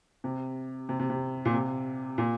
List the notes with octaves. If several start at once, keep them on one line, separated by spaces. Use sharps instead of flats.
C3
C3
C3
C3
A#2
C3
A#2